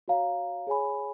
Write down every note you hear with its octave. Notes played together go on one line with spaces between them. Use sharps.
F#4 C#5 F5 A#5
G#4 C#5 G#5 B5